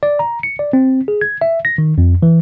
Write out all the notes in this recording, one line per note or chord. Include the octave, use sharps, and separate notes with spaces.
D5
A#5
C#7
D5
C4
G#4
G#6
E5
A#6
D#3
F2
E3